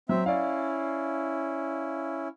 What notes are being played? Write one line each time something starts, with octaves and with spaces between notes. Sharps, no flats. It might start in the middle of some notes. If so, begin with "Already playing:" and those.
F#3 C4 E5
C#4 E4 D5 F5